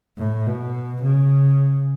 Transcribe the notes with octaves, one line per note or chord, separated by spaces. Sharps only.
A2
B2
C#3